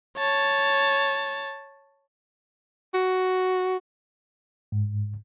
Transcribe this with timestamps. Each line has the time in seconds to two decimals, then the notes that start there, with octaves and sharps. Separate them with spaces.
0.17 C#5 A5
2.94 F#4
4.72 G#2